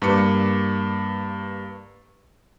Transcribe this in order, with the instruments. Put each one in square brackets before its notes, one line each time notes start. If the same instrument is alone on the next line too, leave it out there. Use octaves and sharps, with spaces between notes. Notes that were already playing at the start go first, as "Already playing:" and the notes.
[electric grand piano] G2 A#3 B4 D6 C#7